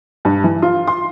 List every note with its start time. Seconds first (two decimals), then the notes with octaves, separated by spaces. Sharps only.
0.25 G2
0.44 E3
0.62 F4
0.88 C6